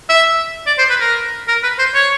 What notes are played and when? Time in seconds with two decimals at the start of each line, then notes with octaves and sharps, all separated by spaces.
0.09 E5
0.67 D5
0.78 C5
0.90 B4
1.01 A#4
1.48 A#4
1.63 B4
1.79 C5
1.94 C#5